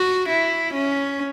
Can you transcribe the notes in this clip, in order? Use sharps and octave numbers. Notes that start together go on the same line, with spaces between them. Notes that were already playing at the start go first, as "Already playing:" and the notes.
Already playing: F#4
E4
C#4